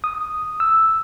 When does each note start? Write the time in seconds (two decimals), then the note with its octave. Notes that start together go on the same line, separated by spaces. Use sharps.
0.04 D#6
0.60 E6